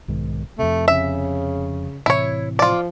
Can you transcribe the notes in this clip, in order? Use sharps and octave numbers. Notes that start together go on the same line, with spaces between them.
B1 G#2 D#3
F2 C3 A3
C#3 E5
A2 C3 E3 E4 C#5
F3 F4 D5